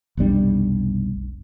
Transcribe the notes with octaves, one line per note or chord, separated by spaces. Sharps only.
F1 B1 G3 D4